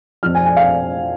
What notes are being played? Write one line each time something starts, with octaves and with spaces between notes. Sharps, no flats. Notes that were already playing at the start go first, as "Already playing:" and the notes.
F2 F3 F6
G#5
G#5
F5